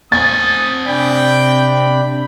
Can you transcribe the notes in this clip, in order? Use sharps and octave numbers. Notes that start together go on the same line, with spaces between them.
C4 G#5 D#6 A6
C3 D4 G5 B5